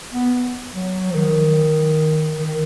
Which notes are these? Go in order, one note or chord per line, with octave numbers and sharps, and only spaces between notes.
B3
F#3
F3
D#3
D#3